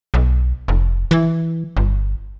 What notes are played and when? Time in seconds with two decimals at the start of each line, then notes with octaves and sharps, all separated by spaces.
0.14 B1
0.68 F1
1.11 E3
1.77 G1